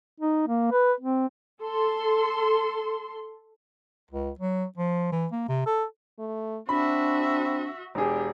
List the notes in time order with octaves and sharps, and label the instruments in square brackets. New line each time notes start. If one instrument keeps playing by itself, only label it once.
[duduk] D#4
A#3
B4
C4
[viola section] A4 C6
[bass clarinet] C#2
F#3
F3
E3
A#3
C3
A4
[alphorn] A3
[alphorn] C4 [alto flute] D4 [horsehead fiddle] F#4 E5 [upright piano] B5
[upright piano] E1 G#4 [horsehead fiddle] D4 G4